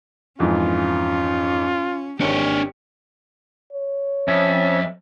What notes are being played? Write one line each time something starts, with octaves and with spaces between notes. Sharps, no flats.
F2 G#2 E3 C#4 F4
G#1 D4 G4 C#5 C#7
C#5
F2 C#4 E5